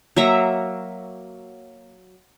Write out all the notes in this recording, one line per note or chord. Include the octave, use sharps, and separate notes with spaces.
F#3 A#3 E5 A#5